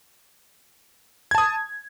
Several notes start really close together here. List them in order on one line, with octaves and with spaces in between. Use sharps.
G#6 A5 D#6